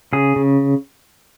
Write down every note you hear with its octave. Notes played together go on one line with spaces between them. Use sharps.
C#3 G#4
C#3